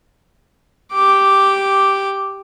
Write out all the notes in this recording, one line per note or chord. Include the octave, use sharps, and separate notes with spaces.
G4 D6